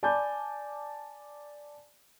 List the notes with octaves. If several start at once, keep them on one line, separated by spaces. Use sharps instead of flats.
D5 G#5 A5 B5 D6 G6